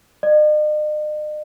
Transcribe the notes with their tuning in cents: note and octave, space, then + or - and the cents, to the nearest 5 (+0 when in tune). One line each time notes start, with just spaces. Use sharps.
D#5 -45